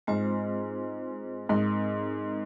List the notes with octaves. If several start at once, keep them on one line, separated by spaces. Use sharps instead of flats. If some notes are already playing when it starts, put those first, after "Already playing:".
G#2 G#3 C4 F4 C5
G#2 C4 D#4 A#4